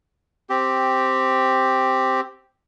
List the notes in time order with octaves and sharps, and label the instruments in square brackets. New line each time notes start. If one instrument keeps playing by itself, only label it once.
[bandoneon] C4 G4